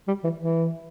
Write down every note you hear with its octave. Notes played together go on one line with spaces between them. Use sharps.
G3
E3
E3